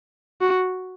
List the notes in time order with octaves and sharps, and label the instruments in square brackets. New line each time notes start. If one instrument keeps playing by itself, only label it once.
[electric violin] F#4